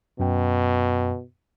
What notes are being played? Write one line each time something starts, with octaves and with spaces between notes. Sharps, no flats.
F#2 B2 G5